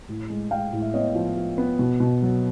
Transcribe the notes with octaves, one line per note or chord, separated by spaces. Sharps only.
A2
G#3
G#3 F5 G5
A2
E5
B3 C#5 D#5
F3
F3
B3
B2
B2
F#3